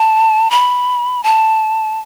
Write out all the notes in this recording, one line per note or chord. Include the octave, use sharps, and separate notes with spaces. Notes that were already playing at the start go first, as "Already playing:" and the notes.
Already playing: A5
B5
A5